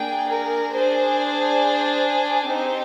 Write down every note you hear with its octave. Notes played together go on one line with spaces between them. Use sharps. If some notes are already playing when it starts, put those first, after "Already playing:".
Already playing: A#3 D4 G#4 G5
A#4
D4 G#4 C5
C4 D#4 G4 C5